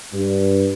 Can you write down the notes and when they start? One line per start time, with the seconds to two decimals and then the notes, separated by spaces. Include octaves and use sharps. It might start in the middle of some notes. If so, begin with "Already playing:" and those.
0.13 G2